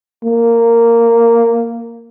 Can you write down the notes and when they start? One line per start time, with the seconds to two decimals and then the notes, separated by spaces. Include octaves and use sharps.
0.24 A#3